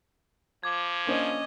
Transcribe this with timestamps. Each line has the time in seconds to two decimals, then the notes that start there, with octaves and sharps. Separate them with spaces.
0.63 F3 D6 G#6
1.07 A#3 C#4 D4 C5 D#5